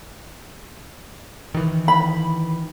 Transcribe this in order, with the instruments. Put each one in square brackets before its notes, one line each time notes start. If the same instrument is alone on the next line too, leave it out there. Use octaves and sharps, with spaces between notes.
[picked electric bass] D#3 E3
[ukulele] B5